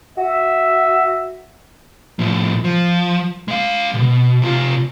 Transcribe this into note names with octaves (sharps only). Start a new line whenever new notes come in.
F#4 E5
A2 F3
F3
G#3 F5
C2 B2
C3 F4